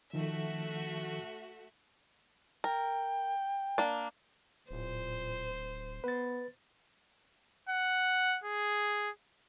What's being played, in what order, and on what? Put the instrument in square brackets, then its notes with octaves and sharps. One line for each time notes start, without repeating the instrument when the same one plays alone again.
[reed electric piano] D#3 F3 [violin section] A3 F#4 E5
[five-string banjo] A#4 [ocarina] G5
[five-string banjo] A#3 D4
[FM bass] D1 [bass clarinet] A#2 [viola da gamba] C5
[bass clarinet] B3 [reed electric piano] B4 A6
[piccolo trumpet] F#5
G#4